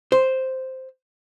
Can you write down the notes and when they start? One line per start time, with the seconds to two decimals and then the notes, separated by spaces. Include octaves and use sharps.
0.12 C5